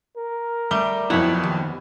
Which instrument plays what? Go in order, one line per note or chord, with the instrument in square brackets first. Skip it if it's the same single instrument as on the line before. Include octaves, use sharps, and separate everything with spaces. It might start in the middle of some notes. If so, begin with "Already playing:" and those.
[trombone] A#4
[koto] G3 [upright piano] A3 D6 G7
[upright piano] B1 F2 [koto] B3 C#5 F#5 [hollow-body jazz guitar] E4
[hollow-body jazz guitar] D#2